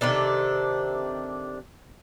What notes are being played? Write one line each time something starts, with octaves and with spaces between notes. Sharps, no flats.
C3 D#3 D4 A4